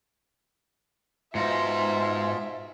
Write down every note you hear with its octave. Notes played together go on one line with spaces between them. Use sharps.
G#2 B2 D#4 F4 E5